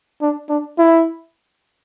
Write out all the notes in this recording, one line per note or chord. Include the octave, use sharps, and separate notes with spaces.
D4
D4
E4